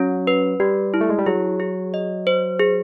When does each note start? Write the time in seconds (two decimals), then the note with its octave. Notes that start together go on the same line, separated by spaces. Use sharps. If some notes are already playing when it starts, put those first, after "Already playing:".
Already playing: F#3 C#4
0.27 B4
0.60 G3 G4
0.94 E4
1.01 A3
1.10 G#3
1.19 G3
1.26 F#3 G#4
1.60 G#4
1.94 D#5
2.27 C5
2.60 G#4